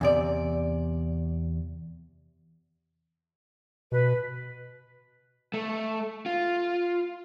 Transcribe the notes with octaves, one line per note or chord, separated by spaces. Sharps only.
E2 C3 D5
B2 B4
A3
F4